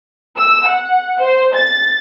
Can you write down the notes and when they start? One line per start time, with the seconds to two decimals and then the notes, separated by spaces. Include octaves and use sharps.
0.37 E6
0.66 F#5
1.20 C5
1.53 A6